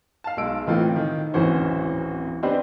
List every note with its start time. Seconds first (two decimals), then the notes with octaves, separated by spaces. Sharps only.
0.24 F5 A5
0.37 B1 G#3 E6 D7
0.67 A2 E3 A3 C4 D#4 F4
0.96 D#3
1.34 D1 G#1 E3 C#4 F#4 C5
2.43 C4 D4 D#4 G4 B4 C5